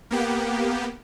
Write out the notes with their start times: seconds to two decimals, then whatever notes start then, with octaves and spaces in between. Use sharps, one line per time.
0.11 A#3 B3 G4